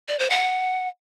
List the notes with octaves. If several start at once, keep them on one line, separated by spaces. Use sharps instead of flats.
D5
C5
F#5